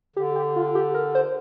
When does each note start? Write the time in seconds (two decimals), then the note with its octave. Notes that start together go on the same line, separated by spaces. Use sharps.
0.16 D3 G4
0.35 G4
0.56 F4
0.75 G4
0.94 A#4
1.15 C5